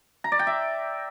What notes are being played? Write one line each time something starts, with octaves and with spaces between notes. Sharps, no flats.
A#5
D5
G5
E5